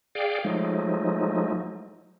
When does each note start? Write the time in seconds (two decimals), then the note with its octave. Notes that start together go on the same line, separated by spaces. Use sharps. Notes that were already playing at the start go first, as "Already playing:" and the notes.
0.15 G#4 D5 F5 G5
0.45 F3 F#3 G#3 A3 D#4